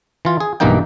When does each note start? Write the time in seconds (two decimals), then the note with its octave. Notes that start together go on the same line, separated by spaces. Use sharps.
0.25 E3 F4
0.40 G#4
0.60 B1 G2 E3 A#3 D#4 G5